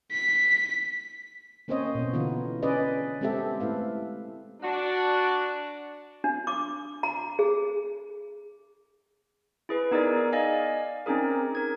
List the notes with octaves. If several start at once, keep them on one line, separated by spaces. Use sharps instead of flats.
B6
A#3 C4 C#4 C5 C#5 D#5
B2 B3
D3 E3 B3 D#4 F4
C#4 G#4 B4 D5 D#5
G#3 B3 C4 G4 A4 E5
A3 E4 B4 F5
D4 F#4
D4
D6
A#5
G#4
E4 G#4 B4
B3 D#4 G#4 A#4 D5
D5 D#5 F5 G#5
C4 C#4 D#4 G#4 A#4
A#4 G#6